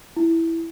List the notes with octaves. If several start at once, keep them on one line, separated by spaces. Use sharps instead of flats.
E4